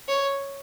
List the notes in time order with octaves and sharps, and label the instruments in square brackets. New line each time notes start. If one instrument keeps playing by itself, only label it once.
[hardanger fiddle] C#5